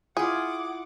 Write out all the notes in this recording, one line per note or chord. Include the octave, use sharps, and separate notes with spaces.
E4 F4 G#4 F#5 D6